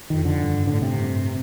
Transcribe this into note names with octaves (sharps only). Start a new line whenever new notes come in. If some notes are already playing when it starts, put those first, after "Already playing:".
F2 D#3
D3
G2
A2 D3
C3
G2